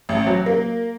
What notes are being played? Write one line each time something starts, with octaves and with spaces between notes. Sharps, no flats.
A1
F#3
A#3